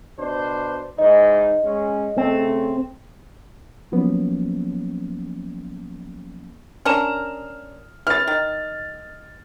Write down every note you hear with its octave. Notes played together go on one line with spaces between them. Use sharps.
B2 D4 C5
G#2 E3 D#4 D#5
G#3 C#4
C#3 A3 C4
F3 F#3 A#3 B3 C#4
C#4 D4 A#4 F6 E7
E3 F6 A6
D#3